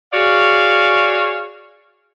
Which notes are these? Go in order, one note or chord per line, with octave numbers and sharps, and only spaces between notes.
F#4 G#4 C#5 D5 F5